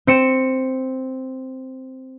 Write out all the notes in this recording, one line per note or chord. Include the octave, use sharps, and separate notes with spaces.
C4 C#7 E7